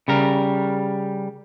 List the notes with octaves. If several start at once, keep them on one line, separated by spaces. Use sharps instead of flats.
C#3 G3 A#4